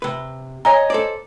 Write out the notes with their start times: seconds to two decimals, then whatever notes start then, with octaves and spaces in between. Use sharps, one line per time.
0.02 C3 B4
0.65 C#5 D#5 G#5 A#5
0.90 A4 C5 D5